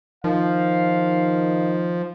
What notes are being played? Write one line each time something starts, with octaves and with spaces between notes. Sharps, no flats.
D#3 F3 F5